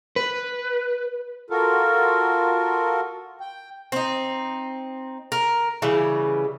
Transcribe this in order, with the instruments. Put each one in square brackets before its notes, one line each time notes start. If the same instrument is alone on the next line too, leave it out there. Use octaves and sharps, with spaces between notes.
[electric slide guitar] B4
[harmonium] F4 F#4 A4 A#4
G5
[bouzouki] C4 D#4
A#4
C#3 E3 G3